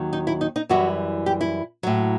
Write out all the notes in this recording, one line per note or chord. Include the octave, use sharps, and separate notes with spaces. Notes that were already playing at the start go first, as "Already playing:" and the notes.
Already playing: D#2 D#3 F#3
D#4
E4
D#4
D#4
F#2 E3 G3 F#4
G4
E4
A2 F#3